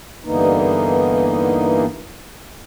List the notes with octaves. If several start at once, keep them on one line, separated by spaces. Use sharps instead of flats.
G2 D3 E3 A#3 B3 D#4